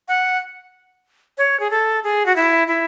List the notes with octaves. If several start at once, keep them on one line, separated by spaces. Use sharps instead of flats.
F#5
C#5
G#4
A4
G#4
F#4
E4
E4